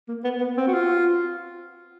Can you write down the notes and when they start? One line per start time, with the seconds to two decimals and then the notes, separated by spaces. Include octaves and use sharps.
0.08 A#3
0.24 B3
0.40 B3
0.57 C4
0.67 F#4
0.74 F4